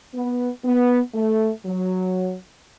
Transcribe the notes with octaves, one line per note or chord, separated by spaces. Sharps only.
B3
B3
A3
F#3